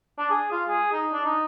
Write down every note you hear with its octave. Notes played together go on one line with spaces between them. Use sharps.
D4
G#4
F4
G#4
D#4
D4
D#4